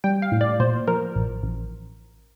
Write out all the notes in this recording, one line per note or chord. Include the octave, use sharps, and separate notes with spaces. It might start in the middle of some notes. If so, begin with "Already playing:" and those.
G3 G5
F5
A2
D5
A#2 C5
F3 A#4
A1
A1